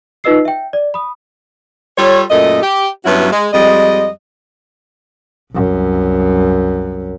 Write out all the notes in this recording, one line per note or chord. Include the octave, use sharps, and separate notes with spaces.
D#4 F4 B4 D#5 E6 C7
E5 G5
D5
B5 D#6
G3 F4 A4 C#5
F#2 A#2 A3 D#5
G4
G2 F#3 B3 C#4 E4 F#4
G#3
F2 G3 G#3 D#5
C2 F#2